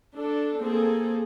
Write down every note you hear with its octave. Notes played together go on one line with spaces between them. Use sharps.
D4 A4
A#3 C4 G#4 A4